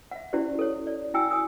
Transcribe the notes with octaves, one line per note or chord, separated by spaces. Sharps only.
E5 F#5
C#4 E4 F#4 G4 C5 D5
A4 C#5
D5
E4 F#4 G5 G#5 E6
G#5 D#6 E6